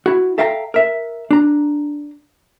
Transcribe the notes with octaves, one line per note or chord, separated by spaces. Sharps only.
E4 F#4
A4 E5 F5 G5 A5 A#5
A#4 E5
D4 A#5